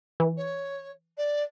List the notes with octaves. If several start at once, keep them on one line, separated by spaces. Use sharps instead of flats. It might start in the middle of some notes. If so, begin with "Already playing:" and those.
E3
C#5
D5